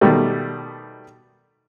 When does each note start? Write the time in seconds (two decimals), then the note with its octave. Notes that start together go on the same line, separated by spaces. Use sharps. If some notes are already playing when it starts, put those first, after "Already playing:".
0.01 B2 D#3 G3 A3